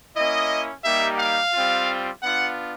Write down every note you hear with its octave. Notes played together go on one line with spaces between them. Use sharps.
A#3 C#4 E4 D#5
G3 A#3 D#4 G4 E5
F5
G3 C4 F4
B3 D4 F4 F#5